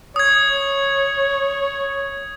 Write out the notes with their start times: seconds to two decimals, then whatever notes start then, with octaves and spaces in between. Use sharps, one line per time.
0.16 C#5 D#6 G#6